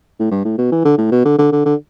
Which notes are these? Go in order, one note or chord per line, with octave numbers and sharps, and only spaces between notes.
A2
G2
A2
B2
E3
D3
A2
B2
D3
D3
D3
D3